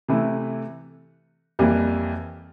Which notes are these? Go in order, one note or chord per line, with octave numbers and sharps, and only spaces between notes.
C3 E3 A3 E4
F2 E3 G3 A#3 E4